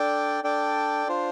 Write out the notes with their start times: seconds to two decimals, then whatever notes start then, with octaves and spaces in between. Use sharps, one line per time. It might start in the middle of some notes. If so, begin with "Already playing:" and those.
Already playing: D4 A4 D5 G5
0.43 D4 A4 D5 G5
1.07 D4 F4 C5